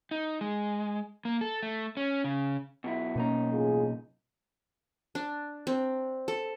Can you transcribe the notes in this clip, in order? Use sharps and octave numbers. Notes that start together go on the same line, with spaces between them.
D#4
G#3
A#3
A4
A3
C#4
C#3
B2 F#3 E4
F#2 B2 A#3 C#4 D#4 A#5
A1 F4 G#4
D4
C4
A4